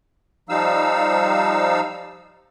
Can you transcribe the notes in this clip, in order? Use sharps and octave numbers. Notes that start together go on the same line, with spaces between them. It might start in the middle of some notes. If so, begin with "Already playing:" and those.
F3 G3 D#4 F5 E6